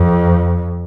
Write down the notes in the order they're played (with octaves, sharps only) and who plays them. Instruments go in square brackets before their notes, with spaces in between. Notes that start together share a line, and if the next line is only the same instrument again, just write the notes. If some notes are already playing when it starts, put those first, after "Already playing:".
Already playing: [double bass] F2